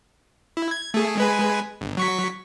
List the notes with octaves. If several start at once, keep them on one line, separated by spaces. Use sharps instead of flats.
E4
G#6
A3 G#4
G#3 B4 G#5
G1
F#3 C#6 B6